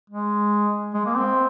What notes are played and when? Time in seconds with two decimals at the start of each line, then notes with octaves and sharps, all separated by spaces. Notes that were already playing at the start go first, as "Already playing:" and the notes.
0.10 G#3
0.94 G#3
1.06 A#3
1.17 C4